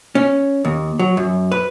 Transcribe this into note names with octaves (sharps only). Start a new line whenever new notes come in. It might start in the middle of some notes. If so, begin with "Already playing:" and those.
C#4
D#2
F#3
F#2
B4